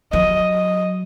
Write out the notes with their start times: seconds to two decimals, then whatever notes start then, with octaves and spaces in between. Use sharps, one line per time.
0.12 F#3 D#5
0.52 D#5